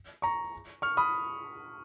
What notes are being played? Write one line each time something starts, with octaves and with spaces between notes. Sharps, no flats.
A#5 C#6
C#6 F6
B5 D#6